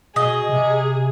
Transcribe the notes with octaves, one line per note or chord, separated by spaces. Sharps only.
B2 G#4 D#5
C3